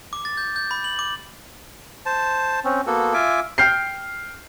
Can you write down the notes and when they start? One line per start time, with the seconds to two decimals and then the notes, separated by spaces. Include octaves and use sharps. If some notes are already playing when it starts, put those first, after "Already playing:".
0.13 D6
0.25 A6
0.37 G6
0.56 G6
0.71 B5
0.84 F#7
0.99 D6
2.06 C5 A5
2.65 C4 C#4
2.87 A#3 B3 F#4 A4
3.14 F4 E5 G#5 D6
3.58 G5 F6 G6 C7